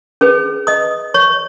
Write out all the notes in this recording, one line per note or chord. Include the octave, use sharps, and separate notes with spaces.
C#4 G#4 B4
D#5 D#6
C#5 C#6